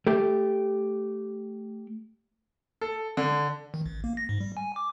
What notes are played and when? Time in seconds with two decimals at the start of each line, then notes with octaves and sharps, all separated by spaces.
0.07 A3 G4
2.81 A4
3.17 D3
3.74 D#3
3.86 A1
4.04 A#3
4.17 A#6
4.29 G#2
4.41 G3
4.57 G#5
4.76 D6